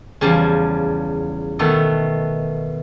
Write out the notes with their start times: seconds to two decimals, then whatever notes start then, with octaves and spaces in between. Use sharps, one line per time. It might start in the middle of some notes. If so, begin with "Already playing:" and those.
0.21 E2 C#3 F3 G3 A5
1.59 B2 D#3 A3 B3 A4